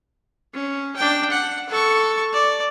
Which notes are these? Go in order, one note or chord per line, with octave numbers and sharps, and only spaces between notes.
C#4
D4 G5
F#5
A4 C#6
D5